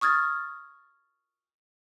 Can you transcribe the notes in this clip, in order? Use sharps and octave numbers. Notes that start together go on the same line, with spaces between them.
C#6 D#6 F6 G#6 A6